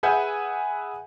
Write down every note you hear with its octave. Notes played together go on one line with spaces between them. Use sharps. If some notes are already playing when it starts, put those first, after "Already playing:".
G#4 B4 E5 F#5 G#5 G6